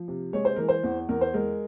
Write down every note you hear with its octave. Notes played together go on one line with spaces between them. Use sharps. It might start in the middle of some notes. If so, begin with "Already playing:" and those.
Already playing: F3
C3
G#3 C#5
C5
E3 A#4
C5
E2
E2 A#4
C5
G#3 A#4